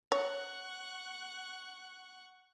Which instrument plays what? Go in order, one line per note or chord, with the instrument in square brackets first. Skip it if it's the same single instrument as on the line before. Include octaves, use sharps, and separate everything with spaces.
[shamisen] C#5 [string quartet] F#5 C#6 F#6